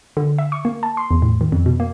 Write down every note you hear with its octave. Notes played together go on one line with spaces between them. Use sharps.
D3
E5
C#6
A#3
A5
C6
E2
A2
D#3
F2
B2
A#3